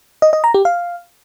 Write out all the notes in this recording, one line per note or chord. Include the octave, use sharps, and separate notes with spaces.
D#5
D#5
A#5
G4
F5